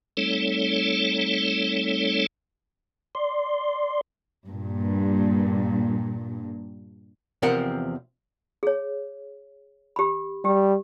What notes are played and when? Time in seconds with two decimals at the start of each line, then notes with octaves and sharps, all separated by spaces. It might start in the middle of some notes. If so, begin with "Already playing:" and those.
0.17 G3 A3 C4 D#4 A4 C#5
3.15 D5 C6
4.48 G2 A#2
7.42 E2 C3 F3 C4 A#4 F#5
8.63 G#4 C#5
9.96 G4 B5
10.45 G3 G4